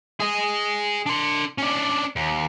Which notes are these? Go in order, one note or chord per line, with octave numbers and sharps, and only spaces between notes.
G#4 D#5
D4 C6
C#4 D4
D#2